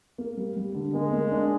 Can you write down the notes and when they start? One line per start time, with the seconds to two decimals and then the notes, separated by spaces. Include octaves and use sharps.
0.18 A#3
0.37 G3
0.57 G3
0.75 D3
0.94 G#3 A#3
1.12 A#3
1.31 D4